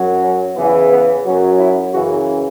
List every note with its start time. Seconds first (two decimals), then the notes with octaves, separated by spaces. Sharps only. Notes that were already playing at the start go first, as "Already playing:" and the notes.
Already playing: F#2 F#3
0.22 C#4
0.56 E2 C#3 E3 B3
0.90 B3
1.24 F#2 F#3 C#4
1.59 E4
1.93 F#2 C#3 E3 F#4